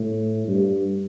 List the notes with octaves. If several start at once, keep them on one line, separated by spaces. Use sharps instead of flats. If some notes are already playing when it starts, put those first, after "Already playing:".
Already playing: A2
G2